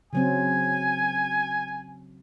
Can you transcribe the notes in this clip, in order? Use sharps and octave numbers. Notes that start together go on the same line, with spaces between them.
C#3 F#3 C4 G#5